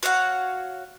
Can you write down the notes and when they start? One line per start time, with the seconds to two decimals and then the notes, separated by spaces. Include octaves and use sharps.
0.03 F#4 C#5 F5 F#5